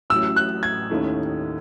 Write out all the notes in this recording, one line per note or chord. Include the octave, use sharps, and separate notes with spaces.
A1 A2 F#3 C#4 E4 E6
F#6
G#6
D#2 D#3 A3 C#4 E4